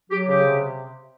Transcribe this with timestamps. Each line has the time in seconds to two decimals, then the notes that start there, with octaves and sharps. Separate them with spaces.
0.10 F#3 G4
0.27 C#3 G4
0.44 C3